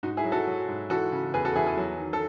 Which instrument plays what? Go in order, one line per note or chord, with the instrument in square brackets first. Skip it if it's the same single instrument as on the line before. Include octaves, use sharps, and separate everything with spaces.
[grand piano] G#2 D#4 F#4
E4 G#4
F#3
F#4 A4
F#3
G#2
E3 F#4 A4
C#3
E2 G#4 B4
F#4 A4
E2 E4 G#4
E4 G#4
F#3
D#3
A4